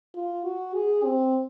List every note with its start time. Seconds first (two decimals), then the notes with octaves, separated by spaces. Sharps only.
0.15 F4
0.44 F#4
0.74 G#4
1.04 C4